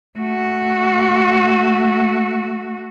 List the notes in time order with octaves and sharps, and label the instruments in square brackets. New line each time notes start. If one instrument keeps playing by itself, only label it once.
[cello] A3 F#4